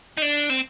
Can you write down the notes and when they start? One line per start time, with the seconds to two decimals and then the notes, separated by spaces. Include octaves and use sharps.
0.17 D#4
0.22 D4
0.50 C4